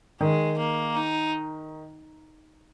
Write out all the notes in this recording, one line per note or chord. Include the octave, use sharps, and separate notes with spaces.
D#3 G#3
A#3
D#4